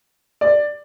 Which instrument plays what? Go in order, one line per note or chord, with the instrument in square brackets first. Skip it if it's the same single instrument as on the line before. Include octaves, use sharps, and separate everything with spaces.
[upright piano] D5